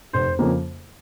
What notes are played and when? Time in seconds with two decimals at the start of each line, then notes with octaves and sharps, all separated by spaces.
0.13 F1 C5
0.39 F2 C#3 F3 A#3